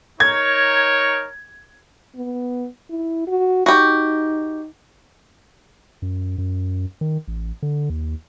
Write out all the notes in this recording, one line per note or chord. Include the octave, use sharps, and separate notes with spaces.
D#4 A#4 C#5 G#6
B3
E4
F#4
D#4 F#4 G4
F#2
F#2
D#3
A1
D3
D#2